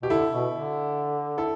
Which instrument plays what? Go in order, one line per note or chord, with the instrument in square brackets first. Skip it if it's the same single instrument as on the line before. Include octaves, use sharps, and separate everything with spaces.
[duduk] B2 [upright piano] G4
[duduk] D3 [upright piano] E4 A4
[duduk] B2
D3
[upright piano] E4 A4